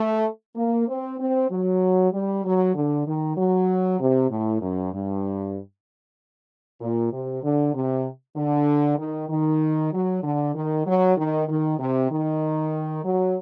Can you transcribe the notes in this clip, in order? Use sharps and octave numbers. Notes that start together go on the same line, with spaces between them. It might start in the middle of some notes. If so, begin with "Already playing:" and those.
Already playing: A3
A#3
C4
C4
F#3
G3
F#3
D3
D#3
F#3
C3
A2
F#2
G2
A#2
C3
D3
C3
D3
D#3
D#3
F#3
D3
D#3
F#3
D#3
D#3
C3
D#3
F#3